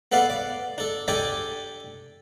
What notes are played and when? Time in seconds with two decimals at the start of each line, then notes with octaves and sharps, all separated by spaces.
0.12 B3 A4 B4 D5 F5 F#5
0.30 D5
0.78 D4 A4
1.08 D4 G4 A4 D5 G#5